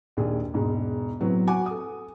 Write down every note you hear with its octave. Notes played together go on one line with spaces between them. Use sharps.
A#1 D#2 G#4
E1 G#2
A2 F#3 B3 C4
F#4 F#5 G#5 D6
A4 D#6